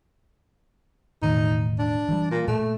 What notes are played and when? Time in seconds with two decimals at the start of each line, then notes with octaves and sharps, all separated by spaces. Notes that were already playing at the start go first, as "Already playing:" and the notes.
1.22 E1 A2 D#3 D#4
1.79 D4
2.09 E3 F3 G3
2.31 A#2
2.48 A#2 A3